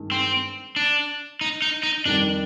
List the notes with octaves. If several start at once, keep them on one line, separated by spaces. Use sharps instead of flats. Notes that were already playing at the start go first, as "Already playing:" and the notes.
Already playing: G2 D#3 G#3
C4
D4
D#4
D#4
D#4
F2 D#3 G3 D4